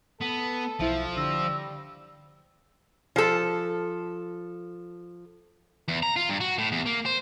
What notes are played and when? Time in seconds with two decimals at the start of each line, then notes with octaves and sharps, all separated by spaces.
0.21 B3 A4
0.80 B1 F3 E4 E5
1.17 D3 G3 E6 A#6
3.16 F3 A4
5.88 E2
6.03 A#5
6.16 F4
6.29 G2
6.41 F#4
6.58 A2
6.72 E2
6.86 A#3
7.06 C5